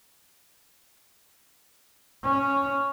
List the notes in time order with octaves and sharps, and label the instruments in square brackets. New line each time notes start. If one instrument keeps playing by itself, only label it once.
[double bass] C#4